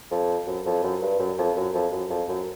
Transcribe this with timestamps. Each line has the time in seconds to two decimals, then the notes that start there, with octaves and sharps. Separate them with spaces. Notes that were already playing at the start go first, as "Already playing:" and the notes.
0.11 F2
0.47 F#2
0.66 F2
0.83 F#2
1.02 G2
1.19 F#2
1.39 F2
1.56 F#2
1.74 F2
1.92 F#2
2.10 F2
2.29 F#2